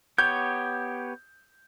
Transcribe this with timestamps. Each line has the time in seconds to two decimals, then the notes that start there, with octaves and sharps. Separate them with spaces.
0.18 B3 G4 C#5 G6